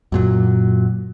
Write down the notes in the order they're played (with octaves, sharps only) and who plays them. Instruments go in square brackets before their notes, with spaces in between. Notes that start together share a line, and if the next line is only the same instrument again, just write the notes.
[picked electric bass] F#2 A#2 F#3